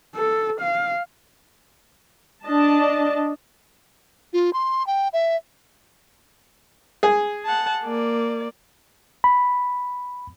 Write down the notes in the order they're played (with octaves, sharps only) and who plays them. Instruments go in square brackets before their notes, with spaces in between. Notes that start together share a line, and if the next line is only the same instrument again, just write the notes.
[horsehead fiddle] A4
F5
[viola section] D4 D#5 A5
[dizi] F4
C6
G5
E5
[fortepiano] G#4
[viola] F#5 A5
A#3 D5
[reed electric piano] B5